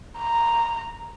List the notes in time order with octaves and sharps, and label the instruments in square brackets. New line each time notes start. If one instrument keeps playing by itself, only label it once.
[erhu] A#5